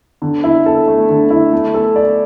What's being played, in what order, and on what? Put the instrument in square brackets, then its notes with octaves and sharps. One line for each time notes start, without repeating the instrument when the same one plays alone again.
[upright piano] D3
E4
A4
A3
D3
E4
A3
A4
D5